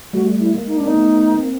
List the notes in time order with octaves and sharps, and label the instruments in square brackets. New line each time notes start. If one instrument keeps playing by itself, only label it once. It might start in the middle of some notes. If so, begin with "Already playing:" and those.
[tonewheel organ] G3 A3 [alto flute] F#4
[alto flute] E4
[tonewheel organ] G#3 A#3
[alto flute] D#4
[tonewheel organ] C#4 [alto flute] D4
[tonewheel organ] C4 [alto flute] D#4
[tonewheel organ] A3 B3
A#3 C4